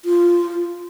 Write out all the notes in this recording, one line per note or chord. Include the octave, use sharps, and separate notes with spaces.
F4